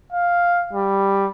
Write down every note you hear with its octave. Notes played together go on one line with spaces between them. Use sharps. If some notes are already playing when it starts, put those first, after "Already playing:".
F5
G3